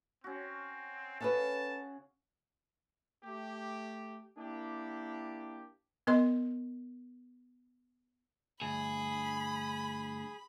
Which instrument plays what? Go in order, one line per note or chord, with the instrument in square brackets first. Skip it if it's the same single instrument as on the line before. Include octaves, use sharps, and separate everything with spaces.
[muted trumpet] C4 [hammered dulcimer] C#4 F#4
[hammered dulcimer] C#3 F#5 [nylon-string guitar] C#4 A4 B4 [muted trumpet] A5
[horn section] A3 G4
A#3 D4 E4 G4
[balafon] B3 A#4 D#5 C6
[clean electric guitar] D2 G2 [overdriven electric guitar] G#4 [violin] B5